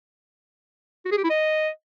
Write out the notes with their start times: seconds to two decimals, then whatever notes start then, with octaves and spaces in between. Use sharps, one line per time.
1.05 F#4
1.11 G#4
1.18 G4
1.24 E4
1.30 D#5